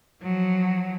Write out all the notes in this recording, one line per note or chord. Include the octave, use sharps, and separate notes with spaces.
F3 F#3